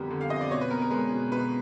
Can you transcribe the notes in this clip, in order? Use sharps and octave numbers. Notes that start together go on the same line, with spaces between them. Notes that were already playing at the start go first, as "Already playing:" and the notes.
Already playing: F2 D3 G3 B3 G4 A#4
D3
F5
F2 D#5
D5
B2 C#5
B4
B3 A#4
A#4
G#3 B4
B2
B2 B4